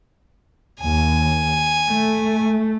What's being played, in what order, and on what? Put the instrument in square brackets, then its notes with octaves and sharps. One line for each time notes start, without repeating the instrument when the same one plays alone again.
[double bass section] D#2 [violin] G#5
[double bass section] A3